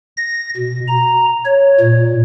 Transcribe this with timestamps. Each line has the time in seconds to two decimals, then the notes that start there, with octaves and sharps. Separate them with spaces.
0.17 A#6
0.57 B2
0.88 A#5
1.45 C#5
1.80 A#2